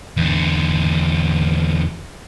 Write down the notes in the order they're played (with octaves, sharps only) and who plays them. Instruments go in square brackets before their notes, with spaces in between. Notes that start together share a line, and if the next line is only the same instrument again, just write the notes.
[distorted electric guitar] E2 D3